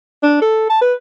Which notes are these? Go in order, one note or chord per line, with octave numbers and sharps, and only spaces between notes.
D4
A4
A5
B4